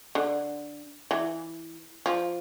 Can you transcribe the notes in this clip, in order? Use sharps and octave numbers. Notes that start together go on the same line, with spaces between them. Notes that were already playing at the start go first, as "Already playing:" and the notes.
D3
E3
F3